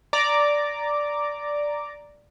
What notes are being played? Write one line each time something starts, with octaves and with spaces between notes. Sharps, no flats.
D5 A#5 D6